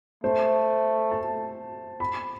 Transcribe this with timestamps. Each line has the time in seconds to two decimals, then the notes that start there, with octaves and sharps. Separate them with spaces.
0.24 A3 C5
1.11 A5
2.00 B5